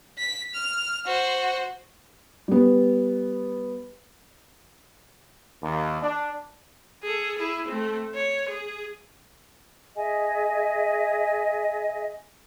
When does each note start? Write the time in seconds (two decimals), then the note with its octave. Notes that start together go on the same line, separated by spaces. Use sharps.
0.18 B6
0.54 F6
1.06 F#4 C5
2.48 G3 B3
5.63 D#2
6.03 D4
7.03 G#4 A4
7.38 E4 G#4
7.68 A3 C4
8.14 C#5
8.49 G#4
9.96 G#4 D#5 E5 G#5